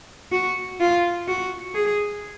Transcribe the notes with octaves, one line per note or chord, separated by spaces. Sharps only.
F#4
F4
F#4
G#4